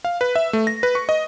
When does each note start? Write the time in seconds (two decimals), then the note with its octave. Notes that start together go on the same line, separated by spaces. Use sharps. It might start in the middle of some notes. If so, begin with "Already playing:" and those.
0.05 F5
0.21 B4
0.36 E5
0.53 A3
0.67 A#6
0.83 B4
0.95 C#6
1.09 D#5